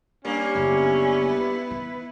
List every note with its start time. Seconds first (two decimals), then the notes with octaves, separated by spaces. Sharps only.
0.25 G2 A#3 C#4
0.55 F#1 B3 E4
1.30 B4
1.71 D#3